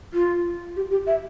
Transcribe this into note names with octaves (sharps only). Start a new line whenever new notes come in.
F4
G4
G4
E5